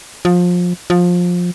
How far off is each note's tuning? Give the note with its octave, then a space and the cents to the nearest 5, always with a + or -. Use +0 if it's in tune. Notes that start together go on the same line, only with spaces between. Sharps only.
F3 +25
F3 +20